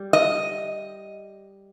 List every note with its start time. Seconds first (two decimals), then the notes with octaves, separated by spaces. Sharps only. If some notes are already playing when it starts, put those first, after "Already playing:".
Already playing: G3
0.13 D#5